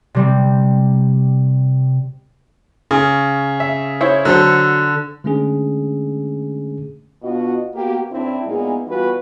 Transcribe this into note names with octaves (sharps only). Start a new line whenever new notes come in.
C3 G3 C4
C#3
E5
E4 C5 C#5
D3 F#3 A4 C5
D3 G#3 A3 C#4 D4 G#4
B2 B3 D4 F4 F#4 D#5
A#3 B3 F#4 G4
C#3 C4 D4 E4
A#2 G#3 B3 D#4 E4 G#4
E3 G3 B3 F4 F#4 B4